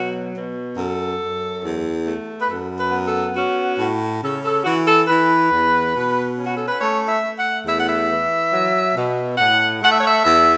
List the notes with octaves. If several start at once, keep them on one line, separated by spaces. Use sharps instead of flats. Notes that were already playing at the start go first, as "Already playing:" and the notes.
Already playing: B2 F#3 F#4
B2
F#2 A4
F#2
E2
A3
B4
F#2 A4
B4
B3
A4
C#4 F#4
A2
C#3 A4
A4
E3 F#4
A4
E3 B4
E2
B2
C#4
F#4
A4
B4
A3 C#5
E5
A3
F#5
E2 E5
F#5
E5
E3
F#3
B2
A2 F#5
A3 F#5
E5
C#5
E5
E2 E5